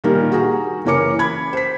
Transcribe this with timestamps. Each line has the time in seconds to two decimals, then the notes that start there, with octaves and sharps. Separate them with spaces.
0.04 A#2 D#3 G3 A#4
0.32 F#4 G#4 A#5
0.85 F#1 E3 C#4 A#4 D6 C#7
1.19 B5 G#6
1.53 C5 B6